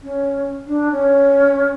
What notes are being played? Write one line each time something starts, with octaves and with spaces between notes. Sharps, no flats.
C#4
D4
C#4